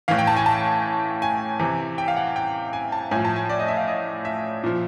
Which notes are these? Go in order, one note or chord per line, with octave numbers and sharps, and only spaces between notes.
A2 E3 F5
G5
A5
G#5
A5
G#5
C3 E3
G5
F5
F#5
G5
G#5
A5
A2 F3 G#5
A5
G#5
D5
D#5
E5
F5
D#5
E5
A#2 F3